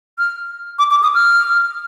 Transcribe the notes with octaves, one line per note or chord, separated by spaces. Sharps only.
F6
D6
D6
D#6
F6